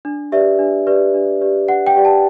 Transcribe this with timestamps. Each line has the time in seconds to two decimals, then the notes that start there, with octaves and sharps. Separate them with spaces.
0.05 D4
0.32 G4 B4 D5 E5
0.59 D4
0.87 G4 B4 D5
1.14 D4
1.41 G4 B4 D5
1.67 D4 F#5
1.87 G5
1.96 G4 B4 D5
2.05 A5